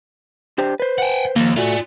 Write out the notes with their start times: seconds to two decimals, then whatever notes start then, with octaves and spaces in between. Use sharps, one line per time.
0.58 D4 G4 C5
0.80 B4 C5
0.98 F#5 G5
1.36 D#2 F3 A#3
1.57 A3 F4 F#4 D5